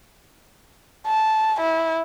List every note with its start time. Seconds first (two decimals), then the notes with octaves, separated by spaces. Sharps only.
1.07 A5
1.61 E4